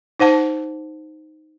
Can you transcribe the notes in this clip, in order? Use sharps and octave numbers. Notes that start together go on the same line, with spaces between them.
D#4 C5 F#5 A5